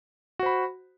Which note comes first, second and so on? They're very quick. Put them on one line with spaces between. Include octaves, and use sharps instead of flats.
F#4 C5 B5